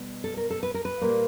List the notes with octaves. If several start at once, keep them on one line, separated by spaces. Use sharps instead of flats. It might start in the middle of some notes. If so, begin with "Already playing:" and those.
Already playing: B2 G3 B3
A4
A#4
A4
B4
A#4
B4
A#2 G3 A#3